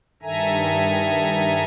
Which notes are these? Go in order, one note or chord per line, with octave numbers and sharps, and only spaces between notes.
G2 D#3 A4 E5 G#5 A#5